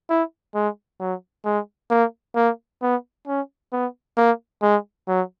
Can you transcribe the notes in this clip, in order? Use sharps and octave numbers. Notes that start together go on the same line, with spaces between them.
E4
G#3
F#3
G#3
A#3
A#3
B3
C#4
B3
A#3
G#3
F#3